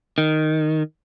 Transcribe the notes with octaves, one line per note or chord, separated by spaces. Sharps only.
D#3